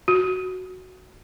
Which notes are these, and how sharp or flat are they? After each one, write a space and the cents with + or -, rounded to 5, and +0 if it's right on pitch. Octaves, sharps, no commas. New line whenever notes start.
F#4 +0